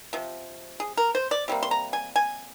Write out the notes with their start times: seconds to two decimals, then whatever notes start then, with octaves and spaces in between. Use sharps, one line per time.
0.13 C3 F3
0.80 G#4
0.97 A#4
1.15 C5
1.31 D5
1.48 C3 G3 A#3
1.63 C6
1.71 A#5
1.93 G#5
2.16 G#5